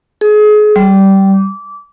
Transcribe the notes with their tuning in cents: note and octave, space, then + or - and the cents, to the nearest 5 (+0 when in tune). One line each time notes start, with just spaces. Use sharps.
G#4 +30
G3 -15
D6 -20